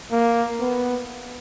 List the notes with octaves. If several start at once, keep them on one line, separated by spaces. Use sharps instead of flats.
A#3
B3